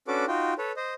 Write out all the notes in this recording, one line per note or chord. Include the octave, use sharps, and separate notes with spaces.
C#4 D4 F#4 A4 B4 D6
D#4 F4 F#4 G5
A4 B4 C#5
C5 D#5